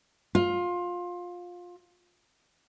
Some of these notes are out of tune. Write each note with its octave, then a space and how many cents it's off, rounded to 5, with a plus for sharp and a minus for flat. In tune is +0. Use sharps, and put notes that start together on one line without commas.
F4 +20